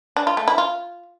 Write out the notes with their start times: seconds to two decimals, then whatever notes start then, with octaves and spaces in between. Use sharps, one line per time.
0.16 D4
0.27 F4
0.37 A3
0.48 E4
0.58 F4